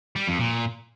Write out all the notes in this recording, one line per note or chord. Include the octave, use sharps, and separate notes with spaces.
G3
F2
A#2